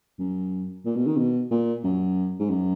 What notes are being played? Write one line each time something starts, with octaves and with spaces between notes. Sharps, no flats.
F#2
A#2
B2
D#3
B2
A#2
F#2
G#2
F#2